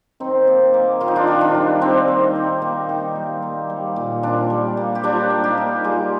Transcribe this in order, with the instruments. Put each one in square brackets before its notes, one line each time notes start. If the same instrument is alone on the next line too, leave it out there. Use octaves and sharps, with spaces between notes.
[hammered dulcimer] D#3 C4 D#4
A#3
A#3
D#3 F4
D#4
D4 F4
D#3
D4 F4
G3
G3 C4 D#4
A#3
D#3
A#3
D#3
G3
A#3
G3
A#2
A#2 D4 F4
G3
A#3
G4
G3 D4 F4
A#3
D#4 G4
A#3
G3 F4 G#4